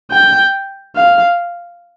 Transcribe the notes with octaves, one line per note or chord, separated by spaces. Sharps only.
G5
F5